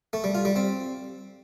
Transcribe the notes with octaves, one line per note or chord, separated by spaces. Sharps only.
A3
G3
F4
G3
C4